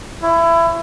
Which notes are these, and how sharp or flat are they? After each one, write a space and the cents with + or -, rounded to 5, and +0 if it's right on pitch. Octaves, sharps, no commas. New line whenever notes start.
E4 +25 C#5 +0